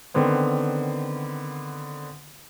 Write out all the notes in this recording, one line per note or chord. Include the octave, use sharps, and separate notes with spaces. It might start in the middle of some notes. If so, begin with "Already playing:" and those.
D3 D#3 B3 C4